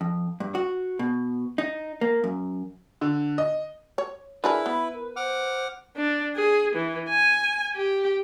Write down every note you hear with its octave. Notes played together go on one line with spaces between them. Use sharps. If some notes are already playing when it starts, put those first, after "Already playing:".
F2
G2
F#4
B2
D#4
A#3
F#2
D3
D#5
C#5
D4 E4 G#4 A#4 B4
B3 B5
A#4
C5 F#5 D6 F6
D4
G#4
E3
G#5
G4